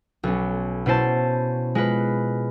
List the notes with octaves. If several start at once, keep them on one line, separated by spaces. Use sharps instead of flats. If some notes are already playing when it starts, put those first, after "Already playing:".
B1 C#4
B2 C#4 E4 C5 A5
G#3 F4 B4